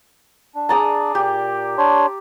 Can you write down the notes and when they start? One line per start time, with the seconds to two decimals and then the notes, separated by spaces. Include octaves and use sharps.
0.55 D4
0.69 G#4 D5 A#5
1.15 A#2 G4
1.78 D4 C#5 C6